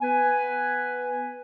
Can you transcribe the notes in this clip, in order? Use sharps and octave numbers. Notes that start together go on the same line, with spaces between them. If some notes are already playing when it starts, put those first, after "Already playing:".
B3 B4 G#5